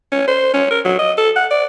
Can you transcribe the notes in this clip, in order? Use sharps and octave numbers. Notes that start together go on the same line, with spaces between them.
C#4
C5
C#4
A#4
F#3
D#5
A4
F#5
D5